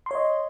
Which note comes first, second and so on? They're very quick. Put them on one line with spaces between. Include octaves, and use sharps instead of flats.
C6 C#5 D#5